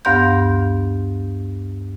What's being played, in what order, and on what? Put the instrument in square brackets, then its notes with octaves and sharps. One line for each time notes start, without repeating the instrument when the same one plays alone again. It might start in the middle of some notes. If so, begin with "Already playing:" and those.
[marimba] D2 G2 B3 F5 C6 G6